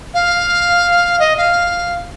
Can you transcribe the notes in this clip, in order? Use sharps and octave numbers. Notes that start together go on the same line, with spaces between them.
F5
D#5
F5